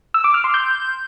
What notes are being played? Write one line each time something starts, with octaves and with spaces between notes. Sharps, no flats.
E6
D6
F6
C6
G6